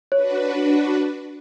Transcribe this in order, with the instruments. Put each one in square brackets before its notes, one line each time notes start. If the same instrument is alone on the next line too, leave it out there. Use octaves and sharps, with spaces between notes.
[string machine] D4 F#4 B4 [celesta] C#5